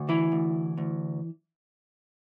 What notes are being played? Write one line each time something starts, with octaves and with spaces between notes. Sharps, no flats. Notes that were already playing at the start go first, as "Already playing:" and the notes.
Already playing: D2
E3 E4
D2
D2